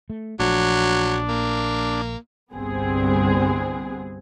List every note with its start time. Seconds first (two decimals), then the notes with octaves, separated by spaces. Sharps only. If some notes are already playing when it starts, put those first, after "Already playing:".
0.10 A3
0.40 A#1 F3 F#3 A3 D4
1.28 A#3
2.54 G1 C2 B3 C4 G#4